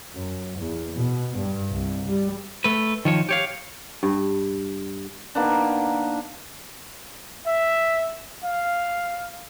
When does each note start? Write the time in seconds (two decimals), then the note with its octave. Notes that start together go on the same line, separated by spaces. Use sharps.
0.15 F#2
0.59 E2
0.98 B2
1.38 G2
1.72 C2
2.08 G3
2.64 A3 B4
3.05 D#3 F3 C#5
3.29 G4 C#5 F5
4.03 G2
5.35 D#3 A#3 B3 D4
7.47 E5
8.44 F5